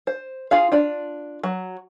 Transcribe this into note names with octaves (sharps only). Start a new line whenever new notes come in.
C5
F4 G#4 F5
D4 F4 D5
F#3